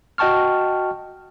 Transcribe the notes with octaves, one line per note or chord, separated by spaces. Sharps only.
F#4 D#5 G5 A5 C#6 F6